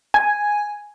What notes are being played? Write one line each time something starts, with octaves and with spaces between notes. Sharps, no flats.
G#5